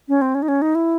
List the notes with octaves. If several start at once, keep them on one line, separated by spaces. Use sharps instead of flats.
C#4
C4
C#4
D#4
C#4
D#4
E4